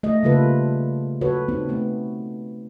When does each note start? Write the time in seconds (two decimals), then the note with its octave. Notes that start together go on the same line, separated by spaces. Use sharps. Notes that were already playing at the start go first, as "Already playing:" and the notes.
0.03 A3 D#5
0.23 C#3 G3 A#3 F4 A4 B4
1.21 F#4 A4 B4 C#5
1.48 B3 C4 D#4
1.69 A3 B3